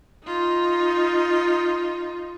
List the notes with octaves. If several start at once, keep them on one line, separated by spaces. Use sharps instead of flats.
D#4 F4